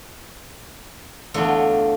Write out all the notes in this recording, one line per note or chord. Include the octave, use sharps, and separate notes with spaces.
E2 D3 A3 F4